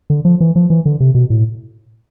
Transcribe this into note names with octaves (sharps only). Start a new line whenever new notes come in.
D3
F3
E3
F3
E3
D3
C3
B2
A2